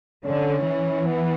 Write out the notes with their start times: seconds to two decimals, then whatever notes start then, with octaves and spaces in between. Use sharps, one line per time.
0.24 D3 C#4
0.66 E3
1.06 B3